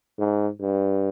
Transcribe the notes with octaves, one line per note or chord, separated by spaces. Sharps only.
G#2
G2